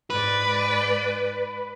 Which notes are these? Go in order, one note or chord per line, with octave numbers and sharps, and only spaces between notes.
G#2 B4 D5